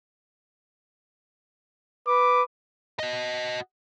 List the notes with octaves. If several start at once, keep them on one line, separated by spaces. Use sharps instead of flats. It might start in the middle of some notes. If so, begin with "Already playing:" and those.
B4 D6
F#4 D#5